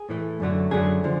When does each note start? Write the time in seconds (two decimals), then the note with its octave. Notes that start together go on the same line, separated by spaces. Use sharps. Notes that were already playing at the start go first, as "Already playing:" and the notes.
Already playing: G#4
0.09 A2 E3 A3
0.40 F#2 D3 F#3 A3
0.71 F#2 D3 F#3 A3 G#4
1.04 D3 F3